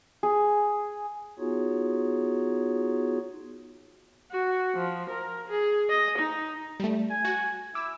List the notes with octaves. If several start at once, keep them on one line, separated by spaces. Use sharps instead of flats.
G#4
B3 D#4 F4 F#4 G#4 C#5
F#4
F3
A#4
G#4
D#5
D#4
G3 A3
G#5
F#4
E4 D6 E6